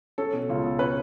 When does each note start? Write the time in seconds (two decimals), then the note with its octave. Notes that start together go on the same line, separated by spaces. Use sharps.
0.18 C#4 A4
0.33 B2
0.49 C#2
0.64 B2
0.79 C#4 B4